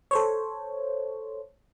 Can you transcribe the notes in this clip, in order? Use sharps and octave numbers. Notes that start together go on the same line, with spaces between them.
A4 C5 C#5